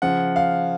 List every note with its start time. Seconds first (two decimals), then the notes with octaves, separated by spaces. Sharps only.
0.02 C#3 F3 F#5
0.36 F5